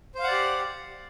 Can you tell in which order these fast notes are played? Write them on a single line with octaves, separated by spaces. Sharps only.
C5 F5 F#5 D5 G4